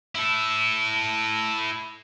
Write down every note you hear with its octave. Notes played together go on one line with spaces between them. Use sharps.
E4 A4